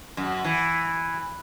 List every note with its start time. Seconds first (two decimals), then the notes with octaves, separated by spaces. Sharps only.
0.17 F#2
0.44 E3